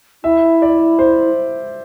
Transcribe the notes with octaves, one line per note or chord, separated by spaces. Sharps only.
E4 E5
D5
C5